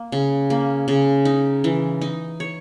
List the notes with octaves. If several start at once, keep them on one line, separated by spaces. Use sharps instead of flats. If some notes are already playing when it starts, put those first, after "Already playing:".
Already playing: A#3
C#3
A#3
C#3
D#4
E3
D#4
C#5